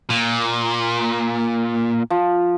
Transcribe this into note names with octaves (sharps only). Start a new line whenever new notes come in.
A#2
F3